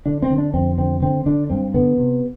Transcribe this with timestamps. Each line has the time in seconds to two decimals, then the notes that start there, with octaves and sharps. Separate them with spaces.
0.06 D3 D4
0.22 C4
0.30 D3
0.38 D4
0.54 F2 C4
0.78 D3 C4
1.02 D3 C4
1.26 D3 D4
1.50 G2 C4
1.74 D3 B3
1.98 C3